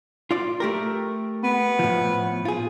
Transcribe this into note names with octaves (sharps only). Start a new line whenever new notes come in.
F4 D5
A3 G4 A#4
B3
A2 F3
F4 G#4